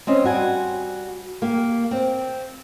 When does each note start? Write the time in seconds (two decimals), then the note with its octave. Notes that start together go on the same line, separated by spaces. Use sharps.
0.07 C4 C#4 D#5
0.24 G3 F#4 G#5
1.42 A#3 G4
1.91 C4